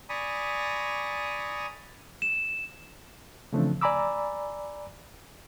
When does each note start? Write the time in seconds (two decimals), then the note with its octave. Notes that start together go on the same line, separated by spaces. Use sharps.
0.09 D5 G#5 A#5 B5 C#6 D#6
2.22 E7
3.53 C#3 E3 F3 A3 C4 D4
3.81 D5 G#5 A#5 B5 D6 E6